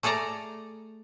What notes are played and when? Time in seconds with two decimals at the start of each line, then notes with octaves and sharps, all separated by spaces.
0.03 A3 G#4 A4 D5 A#5